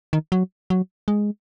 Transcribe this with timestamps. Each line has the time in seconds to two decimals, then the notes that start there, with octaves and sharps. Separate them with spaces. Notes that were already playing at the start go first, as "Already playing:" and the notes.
0.13 D#3
0.32 F#3
0.70 F#3
1.08 G#3